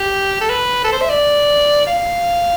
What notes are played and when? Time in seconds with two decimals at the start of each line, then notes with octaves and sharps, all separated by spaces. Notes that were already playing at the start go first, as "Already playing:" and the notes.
Already playing: G4
0.41 A4
0.50 B4
0.84 A4
0.92 C5
1.01 E5
1.10 D5
1.87 F5